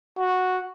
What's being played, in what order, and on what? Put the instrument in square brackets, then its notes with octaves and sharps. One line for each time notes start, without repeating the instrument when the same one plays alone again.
[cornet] F#4